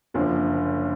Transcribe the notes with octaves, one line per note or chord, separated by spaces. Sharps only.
F#1 F#2 D3 F3 A#3